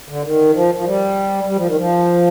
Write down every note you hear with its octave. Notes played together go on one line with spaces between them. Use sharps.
D3
D#3
F3
F3
G3
G3
F3
D#3
F3